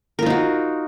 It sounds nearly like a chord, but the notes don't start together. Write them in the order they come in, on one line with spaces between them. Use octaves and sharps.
A#4 F4 D#4 F#4